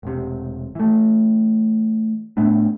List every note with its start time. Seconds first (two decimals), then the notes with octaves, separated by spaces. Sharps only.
0.03 E1 C3
0.75 E3 A3
2.37 A2 A3 B3 D4